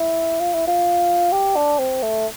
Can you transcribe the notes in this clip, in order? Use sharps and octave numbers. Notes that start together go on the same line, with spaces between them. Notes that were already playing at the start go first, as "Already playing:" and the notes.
Already playing: E4
F4
E4
F4
G4
D4
C4
A3